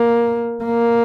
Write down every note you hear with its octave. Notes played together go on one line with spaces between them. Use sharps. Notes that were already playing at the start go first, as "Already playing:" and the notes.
Already playing: A#3
A#3